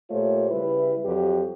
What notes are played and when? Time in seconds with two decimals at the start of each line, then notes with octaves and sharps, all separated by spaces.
0.11 A#2 A3 F4 G4 C5 C#5
0.51 C#3 G3 E4 B4
1.04 F2 F#3 G3 G4